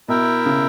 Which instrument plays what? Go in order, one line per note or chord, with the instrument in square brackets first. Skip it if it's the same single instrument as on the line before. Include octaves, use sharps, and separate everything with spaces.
[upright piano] B2 [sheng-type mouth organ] E4 A#4 E5 G5
[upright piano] C#3